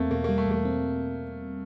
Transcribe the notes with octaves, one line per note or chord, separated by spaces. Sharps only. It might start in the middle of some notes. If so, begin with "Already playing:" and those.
Already playing: E2 A3 A#3 C4
B2 A#3
G3 A#3
A3
E2 A#3
C4